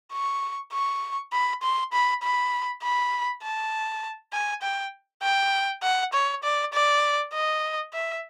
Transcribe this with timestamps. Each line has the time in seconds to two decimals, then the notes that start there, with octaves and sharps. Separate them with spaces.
0.13 C#6
0.73 C#6
1.33 B5
1.62 C6
1.93 B5
2.23 B5
2.83 B5
3.43 A5
4.33 G#5
4.62 G5
5.23 G5
5.83 F#5
6.13 C#5
6.44 D5
6.73 D5
7.34 D#5
7.93 E5